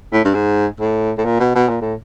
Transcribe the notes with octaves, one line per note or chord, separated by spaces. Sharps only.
A2
G2
G#2
A2
A2
A#2
B2
B2
A#2
A2